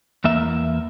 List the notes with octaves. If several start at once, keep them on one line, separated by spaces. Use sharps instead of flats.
E2 A#3 E5